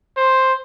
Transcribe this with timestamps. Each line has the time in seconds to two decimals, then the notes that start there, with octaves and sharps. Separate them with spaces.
0.17 C5